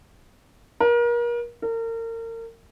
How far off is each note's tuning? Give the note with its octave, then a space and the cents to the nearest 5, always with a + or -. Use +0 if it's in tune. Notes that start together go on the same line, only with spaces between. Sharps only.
A#4 +35
A#4 -35